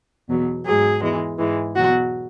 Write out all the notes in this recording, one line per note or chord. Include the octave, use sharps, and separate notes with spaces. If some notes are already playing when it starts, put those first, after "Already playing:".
E2 B2 F#3
G#2 F#3 G#4
E2 E3 G#3
G#2 E3 G#3
E2 B2 F#3 F#4